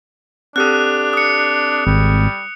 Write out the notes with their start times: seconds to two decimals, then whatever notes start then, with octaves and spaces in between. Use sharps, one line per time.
0.56 C4 D4 G4 A4 D#6 F#6
1.13 D#6 C#7
1.87 G#1 G3